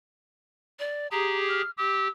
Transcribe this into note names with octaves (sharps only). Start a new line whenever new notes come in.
D5
G4 G#4 A#5
F6
G4 E6